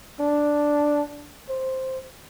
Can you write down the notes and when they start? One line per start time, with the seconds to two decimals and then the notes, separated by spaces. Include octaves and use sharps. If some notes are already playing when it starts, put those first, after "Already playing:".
0.19 D4
1.49 C5